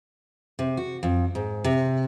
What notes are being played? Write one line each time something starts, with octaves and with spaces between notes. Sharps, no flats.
C3
F#4
F2
G#2
C3